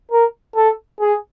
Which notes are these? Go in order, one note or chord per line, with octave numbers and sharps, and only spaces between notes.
A#4
A4
G#4